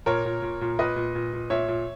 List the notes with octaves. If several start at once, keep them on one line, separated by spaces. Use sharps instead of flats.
A#2 A#4 C#5
A#2
A#2
A#2
A#2 B4 D#5
A#2
A#2
A#2
A#2 C#5 E5
A#2